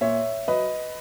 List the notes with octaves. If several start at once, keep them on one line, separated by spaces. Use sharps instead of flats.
A#2 C#5 E5
F#3 B4 D#5